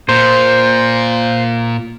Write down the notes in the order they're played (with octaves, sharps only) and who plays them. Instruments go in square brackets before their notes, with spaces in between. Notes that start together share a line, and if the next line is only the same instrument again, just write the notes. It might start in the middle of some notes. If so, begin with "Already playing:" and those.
[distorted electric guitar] A#2 [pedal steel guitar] C5